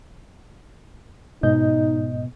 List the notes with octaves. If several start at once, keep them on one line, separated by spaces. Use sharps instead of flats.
G#2 B2 D#4 D#5 G6